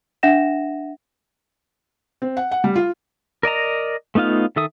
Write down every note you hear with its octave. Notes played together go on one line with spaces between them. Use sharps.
D4 E5 F#5 A#6 E7
C4
F#5
F#5
G3
F4
A#4 D5 D#5 A#5
A3 B3 D#4 F4 F5
D#3 A4 E5 D#6